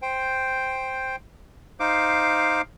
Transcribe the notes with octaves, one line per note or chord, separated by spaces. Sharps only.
C5 G5
D#4 C5 F5 D6